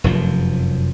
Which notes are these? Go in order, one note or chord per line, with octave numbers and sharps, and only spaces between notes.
F1 F#2 F3